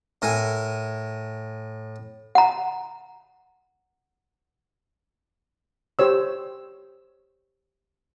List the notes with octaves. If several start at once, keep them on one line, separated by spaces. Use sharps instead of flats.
A2 A#4 G#5
F#5 A#5
G4 C5 C#5 E6